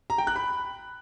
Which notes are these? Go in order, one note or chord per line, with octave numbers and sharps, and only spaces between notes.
A#5
G5
F#6
B5